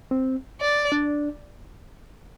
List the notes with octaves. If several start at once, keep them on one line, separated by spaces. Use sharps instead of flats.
C4
D5
D4